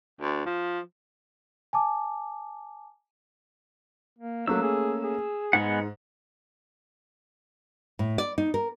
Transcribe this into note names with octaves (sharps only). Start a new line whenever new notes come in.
D2
F3
G#5 A5 D6
A#3
F#3 A3 A#3 C#4 E6
G#4
G#4
G#2 G#3 B3 F#5
A2
D5
D#4
A#4